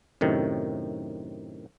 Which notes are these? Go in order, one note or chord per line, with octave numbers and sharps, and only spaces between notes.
F#2 A2 C3 D#3